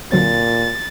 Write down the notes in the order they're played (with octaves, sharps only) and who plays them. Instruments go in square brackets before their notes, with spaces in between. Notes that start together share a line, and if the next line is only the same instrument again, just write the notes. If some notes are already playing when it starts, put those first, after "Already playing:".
[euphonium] A#2 [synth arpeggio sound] D3 F#3 C4 [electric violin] A6